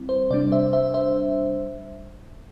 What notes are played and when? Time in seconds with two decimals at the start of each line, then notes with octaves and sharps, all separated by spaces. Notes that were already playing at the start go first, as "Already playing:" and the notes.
Already playing: G3 C4 E4
0.09 C5
0.30 C3 G3 D4 D5
0.52 C5 E5
0.73 C5 E5
0.94 C5 E5